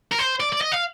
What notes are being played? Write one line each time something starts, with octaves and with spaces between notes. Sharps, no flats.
A#4
C5
D5
D5
D#5
F5